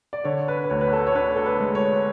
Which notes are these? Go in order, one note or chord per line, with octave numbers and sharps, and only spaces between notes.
D5
D3 C#5
B4
B4
D2 C#5
B4
A4
C#5
D4 B4
A4
B4
G#3
C#5